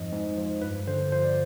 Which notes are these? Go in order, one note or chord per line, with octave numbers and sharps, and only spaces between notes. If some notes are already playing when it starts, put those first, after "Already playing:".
Already playing: F2 G#2 F3 D#5
G#2
F3
G2 B4
D3 C5
F3 C5
D5